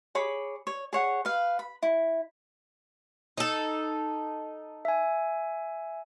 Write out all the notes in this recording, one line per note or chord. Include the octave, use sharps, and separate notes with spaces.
G#4 C#5 B5 D6
C#5
G#4 C#5 F#5
B4 F5
B5
E4
D#4 A4
E5 G#5